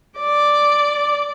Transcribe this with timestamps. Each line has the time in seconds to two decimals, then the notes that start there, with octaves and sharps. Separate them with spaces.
0.20 D5